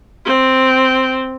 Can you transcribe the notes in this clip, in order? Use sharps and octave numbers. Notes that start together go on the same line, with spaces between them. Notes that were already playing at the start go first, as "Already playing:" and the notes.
C4